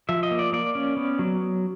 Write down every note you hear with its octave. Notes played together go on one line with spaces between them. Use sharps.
F3 E5
D#5
A#3
D5
A#3 D5
C#4
B3
F#3